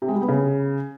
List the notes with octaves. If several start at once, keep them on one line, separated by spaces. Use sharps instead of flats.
C3
G#3
G3
B3
C#3